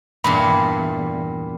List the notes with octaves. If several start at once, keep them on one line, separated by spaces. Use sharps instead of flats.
E2 G2 A#2 B5